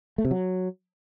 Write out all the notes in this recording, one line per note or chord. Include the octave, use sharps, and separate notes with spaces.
A3
C3
F#3